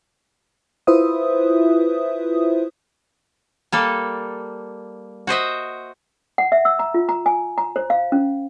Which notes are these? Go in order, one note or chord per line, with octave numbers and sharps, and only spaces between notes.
E4 F4 B4 C5 E5 D#6
G3 A#3 A4
F#4 C5 D#5 E5
F#5
E5
E6
A#5
F4
A#5
G#5
A#5
C5
F5
C#4